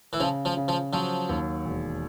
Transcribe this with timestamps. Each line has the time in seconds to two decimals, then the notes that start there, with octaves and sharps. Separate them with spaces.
0.13 E3
0.20 C#3 F3
0.45 F3
0.57 C#3
0.68 F3
0.93 F3 F#3
1.29 D#2
1.66 E1